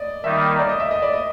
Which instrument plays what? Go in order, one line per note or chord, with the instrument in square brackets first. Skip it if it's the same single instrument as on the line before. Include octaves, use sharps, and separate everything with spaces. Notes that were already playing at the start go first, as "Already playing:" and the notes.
Already playing: [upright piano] D5 D#5
[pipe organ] D#3 G3 A#3 D#4 [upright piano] E5
[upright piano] D5
D#5
E5
D#5
D5
D#5